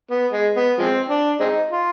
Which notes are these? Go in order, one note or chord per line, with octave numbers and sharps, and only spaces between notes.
B3
G#3
B3
F3 G#3 C4
D4
G#3 C4 D#4
F4